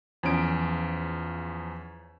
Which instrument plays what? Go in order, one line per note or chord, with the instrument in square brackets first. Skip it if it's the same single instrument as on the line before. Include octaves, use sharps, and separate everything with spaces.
[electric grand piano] E2 F3 C#4 D7